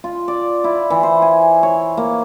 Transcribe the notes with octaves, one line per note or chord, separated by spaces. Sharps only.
F4
D5
E4
E3
C5
G#5
C#5
A#3